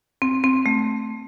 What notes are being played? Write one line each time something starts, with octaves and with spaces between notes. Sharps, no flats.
C4
C4
A3